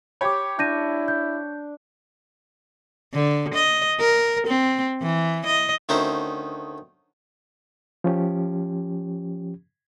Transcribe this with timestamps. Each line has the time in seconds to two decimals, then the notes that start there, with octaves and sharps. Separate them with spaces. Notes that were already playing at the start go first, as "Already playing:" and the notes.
0.21 G4 C#5 B5 D6
0.59 D4 E4 G6 A#6 D#7
1.08 G6
3.14 D3
3.55 D#5
4.00 A#4
4.47 C4
5.02 E3
5.46 D#5
5.89 D2 D#3 C#4 C5 E5 A#5
8.04 F3 C#4 G4